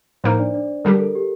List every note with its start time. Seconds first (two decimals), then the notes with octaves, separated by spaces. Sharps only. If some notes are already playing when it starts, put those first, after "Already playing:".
0.24 A2 F3 A#3 D#4 A#4 C5
0.39 D4 D5
0.54 D4 D5
0.85 D3 G3 D4 G4 A#4
0.99 A4
1.15 G4